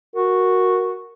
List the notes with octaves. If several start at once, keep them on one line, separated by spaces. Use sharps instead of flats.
F#4 A#4